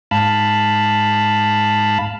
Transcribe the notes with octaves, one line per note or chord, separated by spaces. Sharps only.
G#2 F5 A5 B5